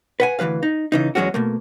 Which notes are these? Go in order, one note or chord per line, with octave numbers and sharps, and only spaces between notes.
B4 F#5 G#5
D2 E3 F3 B4 F5
D#4
C#3 E3 D#4
E2 F#3 G#3 C#4 F#4
B2 A3 A#3